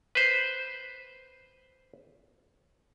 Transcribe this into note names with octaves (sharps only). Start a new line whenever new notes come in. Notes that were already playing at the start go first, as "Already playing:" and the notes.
B4 C5